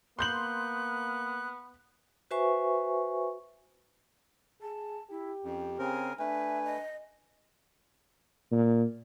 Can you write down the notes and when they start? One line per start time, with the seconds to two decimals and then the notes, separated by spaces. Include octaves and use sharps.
0.19 A#3 B3 C6 F#6 G6 F#7
2.31 F#4 B4 C5 E5 G#5 C#6
4.62 G#4 A5
5.10 E4 G4
5.44 F2 C#4
5.79 C#3 C4 A#4 G#5
6.19 A3 D4 B4 E5 G#5
6.65 D#5
8.51 A#2